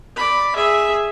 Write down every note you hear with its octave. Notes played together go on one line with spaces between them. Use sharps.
D5 B5
G#4 E5